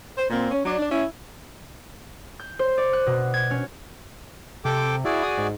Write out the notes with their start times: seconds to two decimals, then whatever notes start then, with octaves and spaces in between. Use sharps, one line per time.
0.17 C5
0.30 A#2 A#3 C4
0.51 C#4
0.66 F#3 D4
0.79 D4
0.91 C#4 E4
2.39 G6
2.59 C5
2.77 D5
2.93 F#6
3.06 B2
3.34 G#6
3.51 C#4
4.65 C3 A4 G5 D6
5.05 E4 F#4 G#4 D5
5.23 D#6
5.38 G#2